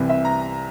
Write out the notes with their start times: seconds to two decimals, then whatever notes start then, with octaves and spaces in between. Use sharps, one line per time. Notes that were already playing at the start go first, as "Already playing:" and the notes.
Already playing: C2 C3 E3
0.09 E5
0.25 A#5